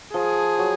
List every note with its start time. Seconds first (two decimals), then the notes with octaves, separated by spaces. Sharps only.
0.14 F3 G#4
0.59 F#3